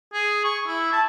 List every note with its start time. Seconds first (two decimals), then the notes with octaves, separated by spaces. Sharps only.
0.13 G#4
0.44 C#6
0.67 E4
0.93 A5